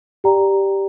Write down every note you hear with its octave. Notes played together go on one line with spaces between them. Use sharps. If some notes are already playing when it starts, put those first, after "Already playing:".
G4 D5 G5 A#5